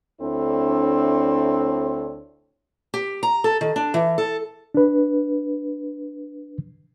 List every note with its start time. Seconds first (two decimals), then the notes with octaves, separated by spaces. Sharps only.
0.21 D2 C4 D4 E4 A4 C#5
2.94 G4
3.23 A#5
3.44 A4
3.61 D#3
3.76 D4
3.94 E3
4.18 A4
4.74 D4 B4